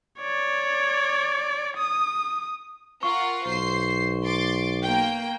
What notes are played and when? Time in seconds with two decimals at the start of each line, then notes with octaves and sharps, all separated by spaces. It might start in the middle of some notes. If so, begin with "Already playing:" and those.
0.20 C#5 D5
1.77 D#6
3.03 F4 A#4 F#5 C#6
3.46 B1 C5 C7
4.25 C6 D6 A6
4.83 A#3 G5